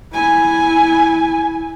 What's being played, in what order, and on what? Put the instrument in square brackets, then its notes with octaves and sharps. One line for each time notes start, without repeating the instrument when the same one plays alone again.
[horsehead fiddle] E4 G#5